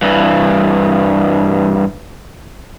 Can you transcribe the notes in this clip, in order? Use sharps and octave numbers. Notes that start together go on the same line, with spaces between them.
G2 E3